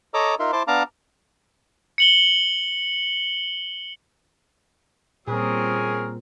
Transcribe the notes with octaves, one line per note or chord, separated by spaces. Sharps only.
A4 C#5 D#5 A#5 D6 E6
D#4 F4 A#4 E5 C6
E4 C5 A5 C6 D6
B3 D4 F5 A5 A#5 D6
C#7 F#7 G7
A#2 G3 C4 C#4 G#4 A#4 D#6